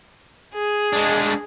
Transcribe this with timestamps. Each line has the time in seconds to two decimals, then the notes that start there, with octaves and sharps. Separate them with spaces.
0.53 G#4
0.93 G#3 D4